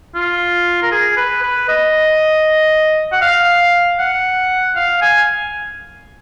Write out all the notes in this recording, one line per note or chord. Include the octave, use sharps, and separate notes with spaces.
F4
A#4
G#4
B4
B4
D#5
F#5
F5
F#5
F5
G#5